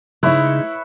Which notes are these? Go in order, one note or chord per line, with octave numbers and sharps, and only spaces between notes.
C#3 G#3 D#4 E4 B4 C#5 E5